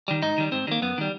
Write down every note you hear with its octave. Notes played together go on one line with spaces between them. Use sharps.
D#3 G3
G#2 D#4
D#3 G3
G#2 C4
D#3 G3 A#3
F#2 B3
D#3 G3